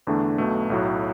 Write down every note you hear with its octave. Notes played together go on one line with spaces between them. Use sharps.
E2 D3 A3 D4
B1 B2 A3
B1 A2 F#3